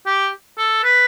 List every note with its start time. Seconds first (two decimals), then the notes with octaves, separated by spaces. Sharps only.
0.06 G4
0.58 A4
0.84 B4